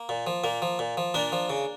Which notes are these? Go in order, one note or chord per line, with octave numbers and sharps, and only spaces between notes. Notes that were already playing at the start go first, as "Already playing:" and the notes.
Already playing: A#3
A#2
F3
A#2 A#3
F3
A#2
F3
A#2 A#3 D4
F3
C#3